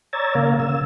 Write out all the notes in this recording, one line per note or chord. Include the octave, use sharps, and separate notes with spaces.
C#5 D5 A#5 E6 G#6 A6
C#3 A#3 A#4 F5
C#3 E6